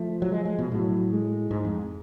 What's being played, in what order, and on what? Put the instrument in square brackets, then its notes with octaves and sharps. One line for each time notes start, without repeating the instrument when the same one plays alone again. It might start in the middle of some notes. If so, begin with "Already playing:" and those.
Already playing: [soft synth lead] F3 [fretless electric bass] A3
[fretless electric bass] F#3
G#3
G#3
B2
[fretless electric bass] A2 [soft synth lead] F#3
[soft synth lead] G#3
[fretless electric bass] G#2
F2